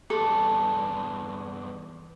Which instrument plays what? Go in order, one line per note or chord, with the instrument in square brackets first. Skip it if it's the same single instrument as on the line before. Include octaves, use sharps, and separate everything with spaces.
[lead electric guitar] E2 G2 [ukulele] A4